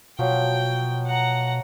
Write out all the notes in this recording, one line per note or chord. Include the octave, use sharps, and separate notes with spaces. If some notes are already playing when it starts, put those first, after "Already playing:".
B2 F3 F#3 G5
F#5 A#5